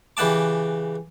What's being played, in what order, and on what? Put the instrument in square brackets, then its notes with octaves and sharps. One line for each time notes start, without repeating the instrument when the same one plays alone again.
[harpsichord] C#3 E3 G4 F#5 A5 D6